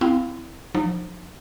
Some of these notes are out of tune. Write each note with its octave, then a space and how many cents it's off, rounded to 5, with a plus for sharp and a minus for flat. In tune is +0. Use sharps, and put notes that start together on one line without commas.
C4 -30 E4 +0 F5 +0
F3 +25 D#4 -35